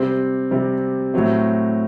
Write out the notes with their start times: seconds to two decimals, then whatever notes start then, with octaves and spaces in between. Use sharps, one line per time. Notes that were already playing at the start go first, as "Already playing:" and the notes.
Already playing: C3 G3 C4
0.51 C3 G3 C4
1.14 A2 F#3 C4